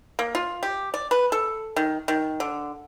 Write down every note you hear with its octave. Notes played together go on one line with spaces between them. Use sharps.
A#3
F4
G4
D5
B4
A4
D#3
D#3
D3